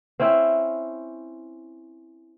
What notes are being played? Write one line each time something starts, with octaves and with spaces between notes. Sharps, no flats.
C4 C#4 E4